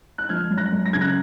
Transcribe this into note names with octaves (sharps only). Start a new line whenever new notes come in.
F#6
F3 F6 G#6
F#2
F#6 A#6
F#2
A#6
C#3 G#6
F#6 A#6